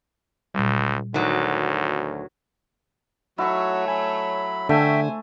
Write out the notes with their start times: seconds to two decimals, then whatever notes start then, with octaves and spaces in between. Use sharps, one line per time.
0.54 C#2 A#2 G3
1.14 D2 D#3 F#3
3.38 F#3 A3 E4 F#4 C#5 C#6
3.88 F#3 G#5 B5
4.69 D3 A3 C5 E5 G5 G#5